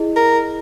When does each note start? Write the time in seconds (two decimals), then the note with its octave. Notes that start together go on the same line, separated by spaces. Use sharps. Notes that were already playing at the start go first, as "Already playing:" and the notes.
Already playing: E4 G#4 D#5
0.16 A#4